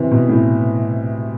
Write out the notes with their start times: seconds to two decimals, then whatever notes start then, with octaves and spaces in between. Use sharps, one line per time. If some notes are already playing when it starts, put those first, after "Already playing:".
Already playing: C3 E3
0.11 B2
0.29 A2